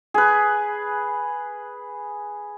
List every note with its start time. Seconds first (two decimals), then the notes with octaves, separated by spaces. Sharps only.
0.14 G#4 B4